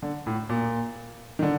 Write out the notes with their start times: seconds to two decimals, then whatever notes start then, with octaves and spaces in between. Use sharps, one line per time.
0.03 D3
0.26 A2
0.49 A#2
1.39 D#3
1.43 D3